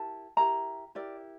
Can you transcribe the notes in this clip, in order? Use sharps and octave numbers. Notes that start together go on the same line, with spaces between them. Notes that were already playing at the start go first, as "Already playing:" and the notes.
Already playing: E4 G4 A#4 A5
E4 G4 A#4 A#5
E4 G4 A#4 D5